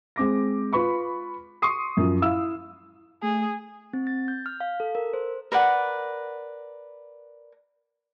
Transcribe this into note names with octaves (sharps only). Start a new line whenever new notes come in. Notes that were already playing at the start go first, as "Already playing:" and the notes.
G#3 C4 D6 A#6
F4 B4 B5 C#6
C6 C#6 D#6 C7
F#2 F3
E4 F5 E6
A3 G#4
C4
A6
G6
F6
F5
A4
A#4
C5
A#4 B4 D5 F#5